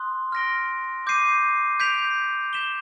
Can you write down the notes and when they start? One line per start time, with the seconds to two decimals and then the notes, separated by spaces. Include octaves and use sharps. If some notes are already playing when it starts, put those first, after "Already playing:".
Already playing: C6 D#6 F#6
0.32 F6 A#6 D7 G7
1.07 D6 G6 C7 D#7
1.80 G6 B6 D7 F7
2.53 G6 B6 E7 G7